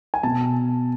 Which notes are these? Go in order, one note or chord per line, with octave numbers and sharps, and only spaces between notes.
G#5
B2 A5